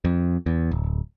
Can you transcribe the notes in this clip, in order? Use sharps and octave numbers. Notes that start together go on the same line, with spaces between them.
F2
E2
D1